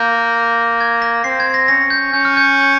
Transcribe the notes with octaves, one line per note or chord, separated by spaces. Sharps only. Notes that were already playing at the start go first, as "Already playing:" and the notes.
Already playing: A#3 G6
G#6
A#6
C4 C7
G#6
A#6
C#4 A#6
G6
C#4 G6
F6
G6